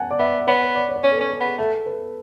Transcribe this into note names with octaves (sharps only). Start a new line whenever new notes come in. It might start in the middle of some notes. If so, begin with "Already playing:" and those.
Already playing: F#5 G#5 A5
D5
B3 E5
B3 C#5
B4
D5
C#5
D5
C#4 C#5
A4
C#4 B4
A4
B3 G#4
A3 A4
B4